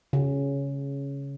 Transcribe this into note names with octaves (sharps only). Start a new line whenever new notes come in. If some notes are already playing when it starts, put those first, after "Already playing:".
C#3